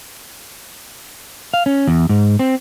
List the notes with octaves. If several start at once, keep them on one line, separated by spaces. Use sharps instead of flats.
F5
C#4
E2
G#2
C4